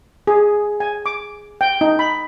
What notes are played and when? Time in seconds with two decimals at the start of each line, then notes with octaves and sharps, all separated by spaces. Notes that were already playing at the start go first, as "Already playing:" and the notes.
0.27 G#4
0.80 G#5
1.06 D6
1.61 G5
1.81 D#4
1.99 B5